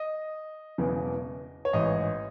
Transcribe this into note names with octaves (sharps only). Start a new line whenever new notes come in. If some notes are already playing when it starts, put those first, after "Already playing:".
Already playing: D#5
E1 E2 C#3 E3
C#5
A1 G#2 E3 D#5